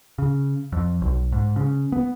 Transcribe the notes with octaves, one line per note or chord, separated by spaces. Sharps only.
C#3
F2
B1
G#2
C#3
B3